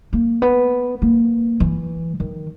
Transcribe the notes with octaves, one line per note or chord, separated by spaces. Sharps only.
A#3
B3
A#3
E3
D#3